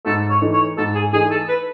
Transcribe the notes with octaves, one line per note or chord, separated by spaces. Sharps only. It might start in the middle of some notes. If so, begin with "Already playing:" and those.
G#2 A4
C#5
E3 A3 D#4
C#5
G#2 A4
G#4
E3 A3 D#4 G#4
A4
B4